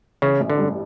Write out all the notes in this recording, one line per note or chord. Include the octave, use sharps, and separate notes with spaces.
C#3 E3
A1
D3
G2